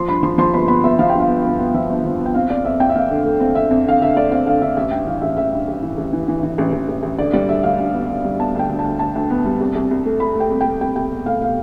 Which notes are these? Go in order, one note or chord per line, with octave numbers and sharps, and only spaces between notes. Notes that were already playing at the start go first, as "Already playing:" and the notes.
Already playing: F3 C6
G2 B5
F3 C6
F3 C6
G1 B5
B3 B5
G1 E5
F3 F5
G2 G5
F5
B3
G1
B3
F3 E5
G1
F3
B3
G5
C4 F5
F2 D5
F2 E5
F2 G5
E5
F2 F5
D3
A3
C4
D3 E5
F2
D3 F5
D3 E5
A3 D5
C4 F5
D3 F5
D3 E5
A1 E5
G2 G5
E3 F5
A1 E5
A1 E5
G2
A1
E3
A1
E3
E3
E3
A1
A1
A1
A1
D3 D5
G3 D5
D2 E5
D2 F5
D2
B3
D3
G3
B3 A5
D2 G5
D2
A5
D2
D2 A5
D2
B3
G3
C2
C2
C2
A3
A3 B5
A3
G5
C2
A3 G5
C2 G5
C2 G5
B2
A3 F5
B2 F5